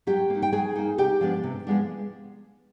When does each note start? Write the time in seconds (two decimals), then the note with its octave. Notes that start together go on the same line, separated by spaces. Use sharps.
0.07 F#3 G4 G5
0.30 A#3 D#4
0.42 G5
0.52 F#3 G#4 G#5
0.76 A#3 D#4
0.98 C3 G4 G5
1.21 F3 G#3 B3 D4
1.44 C3
1.67 F3 G#3 B3 D4